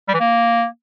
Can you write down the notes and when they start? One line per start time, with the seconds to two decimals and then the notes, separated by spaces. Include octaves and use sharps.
0.08 G3
0.14 E3
0.20 A#3